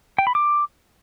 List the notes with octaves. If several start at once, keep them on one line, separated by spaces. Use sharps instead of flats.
G5
B5
D6